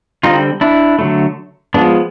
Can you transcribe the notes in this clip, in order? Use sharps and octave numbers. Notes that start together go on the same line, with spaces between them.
D3 G3 C4 D#4 F4
D4 E4
D3 F#3 A3
F3 G#3 B3 D4